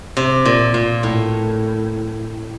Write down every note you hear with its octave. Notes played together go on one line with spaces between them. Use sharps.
C3
A#2
A#2
A2